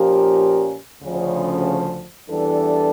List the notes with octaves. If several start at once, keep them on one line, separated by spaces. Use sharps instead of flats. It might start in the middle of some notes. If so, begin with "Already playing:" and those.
Already playing: A#2 F3 C#4 G4 A#4
D2 C#3 F3
E2 E3 G3 D4 A4